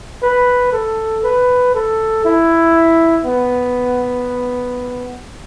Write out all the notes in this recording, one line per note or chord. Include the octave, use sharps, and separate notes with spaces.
B4
A4
B4
A4
E4
B3